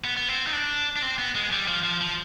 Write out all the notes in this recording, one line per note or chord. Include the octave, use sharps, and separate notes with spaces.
B3
B3
C4
D#4
D4
D4
C4
B3
G#3
G3
F3
F3
F3